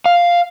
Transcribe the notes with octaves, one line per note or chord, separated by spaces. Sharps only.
F5